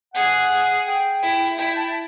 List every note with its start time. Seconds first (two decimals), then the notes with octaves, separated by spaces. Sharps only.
0.14 G#4 F#5
0.86 G5
1.22 E4
1.58 E4 G5
1.76 A5